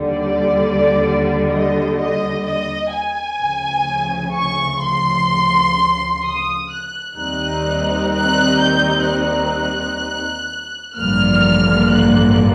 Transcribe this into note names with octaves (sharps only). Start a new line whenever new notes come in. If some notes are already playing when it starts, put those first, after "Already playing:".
Already playing: D#2 D3 G3
D5
D#5
D#5
D#5
G#5
D2 C#3 F3
C#6
C6
D#6
F#6
D#2 D#3 G3 C4 D#4 F#6
F#6
G6
F#6
A1 G2 D3 F3 A#3 F6
F#6